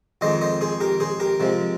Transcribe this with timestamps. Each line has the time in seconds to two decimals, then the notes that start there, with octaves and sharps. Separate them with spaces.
0.21 F2 D#3 G#3 C5 D#5
0.41 C5 D#5
0.61 G#4 C5
0.80 G4 A#4
1.00 G#4 C5
1.20 G4 A#4
1.40 C3 F3 G#3